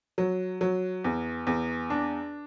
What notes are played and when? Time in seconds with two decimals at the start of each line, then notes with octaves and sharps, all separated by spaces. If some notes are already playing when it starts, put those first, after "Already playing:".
0.18 F#3
0.61 F#3
1.04 E2
1.47 E2
1.90 D4